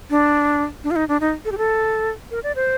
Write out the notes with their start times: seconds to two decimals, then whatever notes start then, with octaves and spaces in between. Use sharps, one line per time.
0.10 D4
0.84 D4
0.91 F4
0.96 D#4
1.08 D4
1.21 D#4
1.45 A4
1.52 G4
1.58 A4
2.31 A#4
2.43 D5
2.56 C5